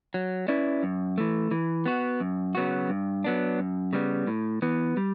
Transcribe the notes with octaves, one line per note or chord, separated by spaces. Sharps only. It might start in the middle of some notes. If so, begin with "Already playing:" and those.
F#3
C#4 E4 B4 D5
F#2
E3 A3
E3
B3 F#4
F#2
C#3 F#3 B3 F#4
G2
F#3 B3 D4
F#2
C#3 G3 B3
A2
E3 B3
G3